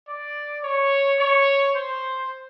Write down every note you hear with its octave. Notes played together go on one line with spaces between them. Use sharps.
D5
C#5
C#5
C5